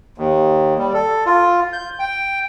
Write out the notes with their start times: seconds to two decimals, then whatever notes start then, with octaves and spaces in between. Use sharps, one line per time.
0.18 D#2
0.79 G3
0.94 A4
1.26 F4
1.73 G6
1.99 G5